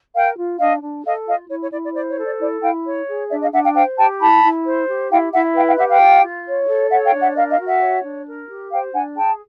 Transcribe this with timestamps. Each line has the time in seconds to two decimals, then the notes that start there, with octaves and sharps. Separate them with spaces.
0.14 A#4 F5 G5
0.37 F4
0.59 D4 D#5 F5
0.82 D4
1.05 A4 D#5 F5
1.26 F4 D#5 F5
1.49 E4 C#5
1.61 C#5
1.72 E4 D5
1.83 D5
1.94 C5 D5
2.10 C#5
2.18 A4
2.25 D5
2.39 E4 D5
2.62 E4 F5 G5
2.85 C#5
3.08 G#4
3.30 D4 D5 E5
3.41 D#5 F5
3.52 D4 E5 F#5
3.64 F5 G5
3.75 C5 F5 G5
3.97 G4 G5 A5
4.20 E4 A5 B5
4.43 E4
4.65 C5
4.88 G4
5.10 E4 F5 G5
5.32 E4 E5 F#5
5.55 B4 F5 G5
5.66 F5 G5
5.78 G4 E5 F#5
5.89 F5 G5
6.00 F4
6.23 F4
6.46 C#5
6.68 A4
6.90 C#5 E5 F#5
7.05 F5 G5
7.13 D4
7.20 E5 F#5
7.35 A#4 D#5 F5
7.50 D#5 F5
7.59 F#4
7.65 E5 F#5
7.81 C#5
8.03 D4
8.26 A#4
8.48 G4
8.71 C5 F5 G5
8.93 D4 F#5 G#5
9.16 G#4 G5 A5